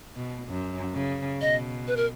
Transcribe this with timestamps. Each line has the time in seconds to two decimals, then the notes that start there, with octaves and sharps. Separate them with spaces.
0.17 B2
0.48 F#2
0.94 C#3
1.41 B2 D#5
1.88 B4
1.97 A#4